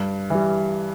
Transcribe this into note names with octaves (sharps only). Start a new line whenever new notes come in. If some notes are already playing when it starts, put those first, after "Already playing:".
Already playing: G2
E3 G3